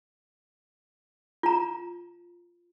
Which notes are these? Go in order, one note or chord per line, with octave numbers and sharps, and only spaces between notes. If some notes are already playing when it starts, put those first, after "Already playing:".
F4 A#5